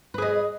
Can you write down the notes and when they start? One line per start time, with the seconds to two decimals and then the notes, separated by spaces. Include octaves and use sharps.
0.14 B4
0.18 G#4
0.22 D#5